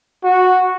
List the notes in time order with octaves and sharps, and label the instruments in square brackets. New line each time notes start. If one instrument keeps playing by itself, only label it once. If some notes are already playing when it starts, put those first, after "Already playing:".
[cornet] F#4